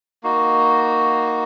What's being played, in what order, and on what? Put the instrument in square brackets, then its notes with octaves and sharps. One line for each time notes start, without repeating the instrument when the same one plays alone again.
[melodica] A#3 D#4 F#4